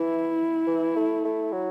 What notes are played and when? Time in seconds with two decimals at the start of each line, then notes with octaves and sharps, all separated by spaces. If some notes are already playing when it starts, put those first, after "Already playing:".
Already playing: E3 E4
0.67 E3
0.96 A3
1.24 A3
1.52 F#3